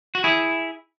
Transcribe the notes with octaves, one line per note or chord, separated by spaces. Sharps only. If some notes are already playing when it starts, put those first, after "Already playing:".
F#4
E4 G#4